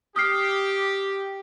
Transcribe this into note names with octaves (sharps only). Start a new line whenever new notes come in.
G4 D#6 F6 C7